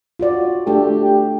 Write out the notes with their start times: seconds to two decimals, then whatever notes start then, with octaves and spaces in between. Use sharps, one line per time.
0.19 F4 F#4 D5
0.67 A3 D4 G4 A4